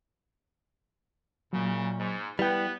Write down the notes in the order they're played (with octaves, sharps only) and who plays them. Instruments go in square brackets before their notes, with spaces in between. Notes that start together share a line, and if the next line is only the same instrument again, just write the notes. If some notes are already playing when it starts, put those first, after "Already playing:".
[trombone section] F#2 C#3 [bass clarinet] A#2 [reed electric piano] F#3 A#3
[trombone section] G#2
[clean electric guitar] G3 G5 [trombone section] B3 [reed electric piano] E4 [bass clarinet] B4